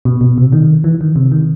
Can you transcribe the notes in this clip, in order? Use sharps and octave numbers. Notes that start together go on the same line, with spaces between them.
B2
B2
C3
D#3
E3
D#3
C3
D#3